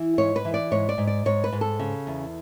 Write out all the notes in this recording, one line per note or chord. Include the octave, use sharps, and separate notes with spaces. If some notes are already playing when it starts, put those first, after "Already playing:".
Already playing: E3
G#2 C#5
B4
E3
D5
G#2 C#5
D5
G#2
D5
G#2 C#5
B4
G#2
A4
C#3
E2